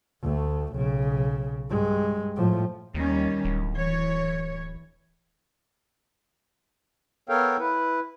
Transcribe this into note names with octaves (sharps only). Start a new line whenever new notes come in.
D2 A3
B1 C#3
G2 G#3
A2 F3
D#2 D#3 G3 C#4
D1
E3 C#5
B3 A4 A#4 C#5 F5 G5
E4 B4